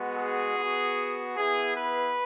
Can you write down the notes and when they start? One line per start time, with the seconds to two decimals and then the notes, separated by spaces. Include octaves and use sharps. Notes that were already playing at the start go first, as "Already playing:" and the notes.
Already playing: G#3 B3 F#4
0.18 G#4
0.57 B3 F#4
1.37 B3 E4 G#4
1.76 B4